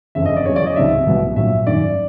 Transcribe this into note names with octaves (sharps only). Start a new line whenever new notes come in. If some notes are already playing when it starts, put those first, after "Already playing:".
G1 F2 C#3 E5
D#5
D5
E2 C#3 F#3 C#5
D5
D#5
C#2 C3 D#3 F#3 E5
C2 B2 F#3
A#1 A#2 F#3 E5
G#1 F#2 D#3 F#3 D5